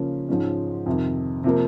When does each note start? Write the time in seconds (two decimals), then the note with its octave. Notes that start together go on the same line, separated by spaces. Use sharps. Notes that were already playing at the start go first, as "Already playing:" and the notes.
Already playing: C#3 F3 A#3 C#4
0.29 G#2 F3 G#3 C#4
0.86 F2 C3 D#3
1.44 C3 F3 A#3